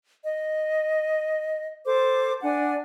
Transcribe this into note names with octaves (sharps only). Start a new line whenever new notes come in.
D#5
A4 C5 D6
D4 F#5 G#5